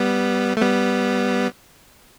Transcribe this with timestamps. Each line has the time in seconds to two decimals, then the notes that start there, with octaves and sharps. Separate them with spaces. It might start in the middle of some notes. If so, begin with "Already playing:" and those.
Already playing: G3 B3
0.57 A3
0.61 G3 B3